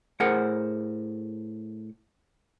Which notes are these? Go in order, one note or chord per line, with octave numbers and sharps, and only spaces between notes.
A2 G#4 A#4 C5 F#5